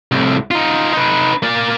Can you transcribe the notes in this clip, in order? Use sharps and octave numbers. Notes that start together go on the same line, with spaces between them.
C2 A2
D#4 F4
D#4 B4
A#3 D5